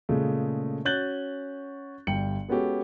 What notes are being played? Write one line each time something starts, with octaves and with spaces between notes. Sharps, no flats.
A#2 C#3 G#3 A3
C#4 F#4 F#6 G6 A6 F#7
G1 G3 G5 C#7 F#7
G#3 B3 C#4 F#4 G4 A4